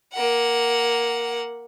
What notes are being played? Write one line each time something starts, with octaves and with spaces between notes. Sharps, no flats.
A#3 F#5